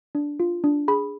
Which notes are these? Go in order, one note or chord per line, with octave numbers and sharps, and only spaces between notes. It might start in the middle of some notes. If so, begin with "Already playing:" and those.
D4
F4
D4
G#4 B5